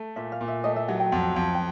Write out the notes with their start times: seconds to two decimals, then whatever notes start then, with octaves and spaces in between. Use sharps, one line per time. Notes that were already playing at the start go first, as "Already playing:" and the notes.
Already playing: A3
0.16 A#2 E5
0.32 F5
0.41 A#2
0.48 E5
0.64 A3 D#5
0.76 E5
0.88 F#3 F#5
1.00 G5
1.12 F2 F#5
1.35 F2 F5
1.54 G5